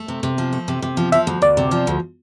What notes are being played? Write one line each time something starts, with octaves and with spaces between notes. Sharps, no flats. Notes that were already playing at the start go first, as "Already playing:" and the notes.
Already playing: A3
C3
C3
F3
A3
C3
C3
F3
F3 E5
D2
D2 D5
C3
F3
D2